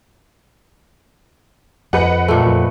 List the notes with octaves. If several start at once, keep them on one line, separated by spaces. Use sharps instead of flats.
F2 B4 D#5 F#5
A#2 A3
F2